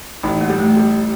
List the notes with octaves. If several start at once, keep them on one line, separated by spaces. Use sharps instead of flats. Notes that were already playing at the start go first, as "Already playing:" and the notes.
A1 D#4
A#3
G3
A3
G3